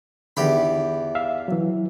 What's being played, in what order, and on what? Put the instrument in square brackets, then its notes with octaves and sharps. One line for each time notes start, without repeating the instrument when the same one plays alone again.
[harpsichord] E2 G4 B5 [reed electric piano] D3 D#3
[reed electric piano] E5 F5
E3 F#3